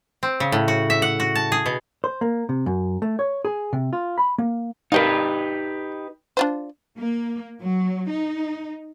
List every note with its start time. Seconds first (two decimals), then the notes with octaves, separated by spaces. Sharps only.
0.23 C4
0.40 C#3
0.52 A2
0.68 F#4
0.90 E5
1.02 F#5
1.20 F#4
1.36 A5
1.52 G#4
1.66 B2
2.04 C5
2.21 A#3
2.49 C3
2.66 F#2
3.02 A3
3.19 C#5
3.45 G#4
3.73 C3
3.93 F4
4.18 B5
4.38 A#3
4.92 D#4 G4 A#4 B4 D#5 F5
6.37 D4 F4 C5
6.98 A#3
7.60 F#3
8.10 D#4